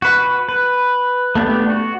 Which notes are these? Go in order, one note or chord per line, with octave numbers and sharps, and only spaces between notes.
F#4 B4
B4
A3 B3 D4 G4
F#4